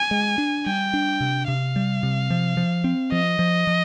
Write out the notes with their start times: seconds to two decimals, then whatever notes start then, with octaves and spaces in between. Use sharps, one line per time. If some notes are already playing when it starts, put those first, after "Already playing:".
Already playing: G#5
0.11 G#3
0.38 D4
0.66 G3 G5
0.94 D4
1.21 C3
1.48 C3 F5
1.76 G3
2.03 C3
2.30 F3
2.57 F3
2.84 C4
3.12 F3 D#5
3.39 F3
3.67 F3